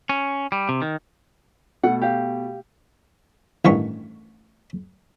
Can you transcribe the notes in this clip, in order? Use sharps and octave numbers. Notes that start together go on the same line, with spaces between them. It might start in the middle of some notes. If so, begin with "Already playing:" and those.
C#4
G3
C3
D#3
B2 A3 F#5
G4 F5
A1 G2 D#3 E3 C#6